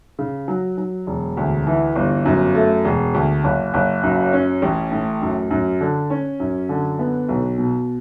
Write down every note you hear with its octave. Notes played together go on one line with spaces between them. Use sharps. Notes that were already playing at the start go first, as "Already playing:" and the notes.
C#3
F#3
F#3
E1
D2
E3
G1
F#2
A3
E1
D2
F#1
F#1
F#2
C#4
A1
A2
F#2
F#2
D3
C#4
F#2
D3
B3
B1
B2